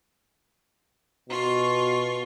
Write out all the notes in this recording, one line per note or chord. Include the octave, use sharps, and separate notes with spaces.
B2 F4 C#6